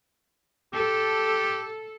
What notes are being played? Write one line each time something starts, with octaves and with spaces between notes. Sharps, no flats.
G4 A4